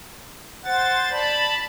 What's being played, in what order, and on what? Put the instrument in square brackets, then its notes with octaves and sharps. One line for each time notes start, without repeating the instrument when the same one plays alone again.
[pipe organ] C5 A6 [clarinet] F#5
[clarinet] D5 [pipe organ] A5 B5